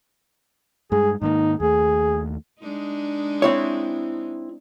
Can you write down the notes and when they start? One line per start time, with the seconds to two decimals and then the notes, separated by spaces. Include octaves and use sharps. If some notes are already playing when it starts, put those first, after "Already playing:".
0.92 G2 G#3 G#4
1.22 G#2 D#3 A#3 D#4
1.60 D#2 A3 G#4
2.60 G#3 D4 D#4
3.42 C4 E4 C#5